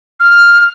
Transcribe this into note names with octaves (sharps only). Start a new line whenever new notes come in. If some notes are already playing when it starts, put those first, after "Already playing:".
F6